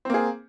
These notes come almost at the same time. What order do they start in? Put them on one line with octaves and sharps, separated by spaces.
C4 A#3 G#4